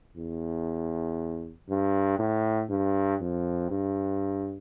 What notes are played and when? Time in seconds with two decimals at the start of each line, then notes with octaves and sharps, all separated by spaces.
0.17 E2
1.69 G2
2.19 A2
2.70 G2
3.21 F2
3.71 G2